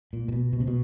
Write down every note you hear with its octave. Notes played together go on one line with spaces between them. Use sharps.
A#2
A#2
B2
B2
C3
B2